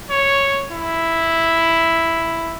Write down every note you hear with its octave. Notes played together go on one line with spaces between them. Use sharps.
C#5
E4